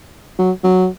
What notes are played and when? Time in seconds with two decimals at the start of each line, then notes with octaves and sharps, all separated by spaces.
0.39 F#3
0.64 F#3